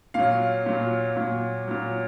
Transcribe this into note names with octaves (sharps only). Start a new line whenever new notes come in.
A#2 F#3 F5
A#2 F#3
A#2 F#3
A#2 F#3